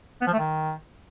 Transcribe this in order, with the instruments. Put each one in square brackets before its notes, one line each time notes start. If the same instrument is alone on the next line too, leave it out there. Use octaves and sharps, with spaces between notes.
[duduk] B3
F3
A3
D#3